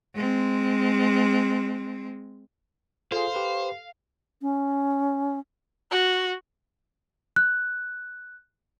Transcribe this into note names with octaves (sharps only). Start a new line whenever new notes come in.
G#3 C4
F4 G#4 A4 C5 F5
G4 B4
C#4
F#4
F#6